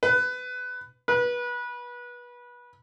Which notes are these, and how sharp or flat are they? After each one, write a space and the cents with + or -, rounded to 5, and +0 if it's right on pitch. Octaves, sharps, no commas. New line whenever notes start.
B4 +20
B4 -25